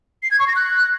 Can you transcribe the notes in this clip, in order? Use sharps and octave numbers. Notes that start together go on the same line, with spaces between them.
C7
G#6
C#6
A#6
F#6